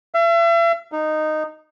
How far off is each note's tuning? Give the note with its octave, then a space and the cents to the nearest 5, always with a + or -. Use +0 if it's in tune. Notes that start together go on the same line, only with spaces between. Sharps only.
E5 +40
D#4 -10